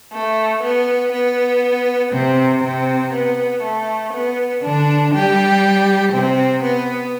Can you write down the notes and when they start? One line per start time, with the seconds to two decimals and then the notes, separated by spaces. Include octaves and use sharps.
0.13 A3
0.64 B3
1.13 B3
2.13 C3 C4
2.63 C3 C4
3.13 B3
3.63 A3
4.14 B3
4.63 D3 D4
5.13 G3 G4
6.13 C3 C4
6.63 B3